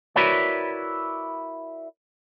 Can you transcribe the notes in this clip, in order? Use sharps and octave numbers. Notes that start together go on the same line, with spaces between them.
E4 F#4 A#4 B4 C#5 D5